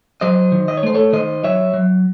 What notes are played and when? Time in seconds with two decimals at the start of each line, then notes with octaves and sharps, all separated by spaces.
0.21 F#3 C5 D#5
0.52 D#3
0.68 D#5
0.77 C#5
0.83 A3 C5
0.95 A4 C#5
1.13 D#3 C5 D#5
1.43 F#3 C#5 E5
1.74 F#3